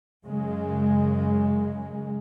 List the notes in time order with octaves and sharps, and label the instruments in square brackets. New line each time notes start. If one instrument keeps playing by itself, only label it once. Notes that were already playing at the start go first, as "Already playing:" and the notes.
[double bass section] F#2 C#3 G#3